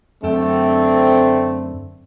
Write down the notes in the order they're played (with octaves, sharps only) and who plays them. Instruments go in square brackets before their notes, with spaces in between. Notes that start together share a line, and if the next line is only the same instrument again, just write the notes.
[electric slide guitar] F#2 A4 G5 [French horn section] D3 C4 [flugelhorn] A3